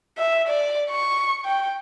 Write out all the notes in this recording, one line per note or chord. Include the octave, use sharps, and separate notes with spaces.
E5
D5
C#6
G5